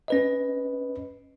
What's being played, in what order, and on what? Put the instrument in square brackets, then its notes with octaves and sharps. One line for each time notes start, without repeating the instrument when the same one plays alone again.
[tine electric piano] C#4 B4 D#5